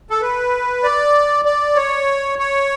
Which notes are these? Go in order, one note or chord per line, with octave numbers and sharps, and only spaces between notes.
A4
B4
D5
D5
C#5
C#5